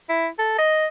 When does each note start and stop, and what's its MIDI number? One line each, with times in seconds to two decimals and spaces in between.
0.09 0.27 64
0.39 0.57 69
0.58 0.86 75